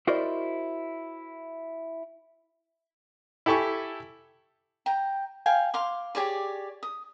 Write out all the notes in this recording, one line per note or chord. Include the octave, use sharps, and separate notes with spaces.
E4 F#4 A#4 C5 D5 D#5
E4 G4 A4 G#5 C#6
G5 A#5
F5 G5 G#5
F5 C6 D6
G4 G#4 C#5 D5
D#6